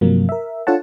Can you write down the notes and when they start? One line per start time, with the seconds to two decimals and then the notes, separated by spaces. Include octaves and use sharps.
0.01 G2 C3 F3 F#3 A#3
0.29 A#4 E5
0.67 D4 F4 A4 C#5 F#5 A5